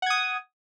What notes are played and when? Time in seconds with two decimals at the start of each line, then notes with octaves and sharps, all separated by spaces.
0.02 F#5
0.06 G#6
0.10 D#6